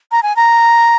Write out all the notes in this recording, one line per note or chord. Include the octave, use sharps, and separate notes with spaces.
A#5
G#5
A#5